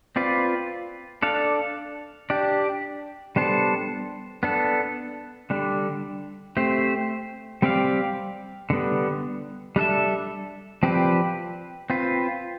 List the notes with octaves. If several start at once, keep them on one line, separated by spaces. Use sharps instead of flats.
C4 F4 B4 D5
D4 A4 D5 F5
D4 G4 D5
G3 B3 D4 A4 C5
B3 D4 A4
D3 G3 D4
A3 C4 G4 C5
G3 C4 G4 D5 F5
D3 G3 B3
G3 D4 A4 E5
F3 C4 G4 B4 D5
C4 F4 B4